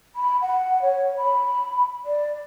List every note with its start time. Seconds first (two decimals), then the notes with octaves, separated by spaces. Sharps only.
0.16 B5
0.42 F#5
0.82 C#5
1.17 B5
2.06 D5